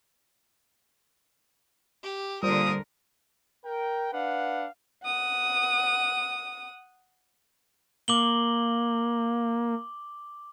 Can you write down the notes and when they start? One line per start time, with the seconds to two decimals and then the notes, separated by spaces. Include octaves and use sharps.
2.03 G4
2.43 A#2 D3 G3 A#4 C5 D#6
3.65 A#4 G5
4.13 D4 B4 F5 F#5
5.04 F#5 D#6
8.08 A#3 D6 F#7 G7